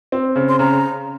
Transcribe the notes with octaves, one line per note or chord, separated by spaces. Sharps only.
C4
C#3
C6
C#3 A#5